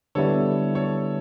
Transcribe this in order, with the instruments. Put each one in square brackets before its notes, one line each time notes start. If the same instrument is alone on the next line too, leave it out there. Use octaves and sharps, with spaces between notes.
[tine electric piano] D3 G3 B3 E4 [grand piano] A4 C#5
[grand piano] A4 C#5